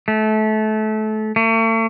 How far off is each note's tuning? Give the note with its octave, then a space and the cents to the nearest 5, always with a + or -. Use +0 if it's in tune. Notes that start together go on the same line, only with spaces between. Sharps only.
A3 -25
A3 +40